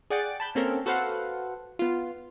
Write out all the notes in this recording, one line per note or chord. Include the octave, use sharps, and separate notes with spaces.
G#4 D5 F#5 G5 A6 D7
A5 B5 G6
A#3 C4 C#4 A4 A#4
F#4 A4 B4 C5 F5 F#5
B3 F4